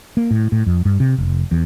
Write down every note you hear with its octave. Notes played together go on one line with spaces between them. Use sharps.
A#3
A2
A2
F2
G2
C3
F1
E2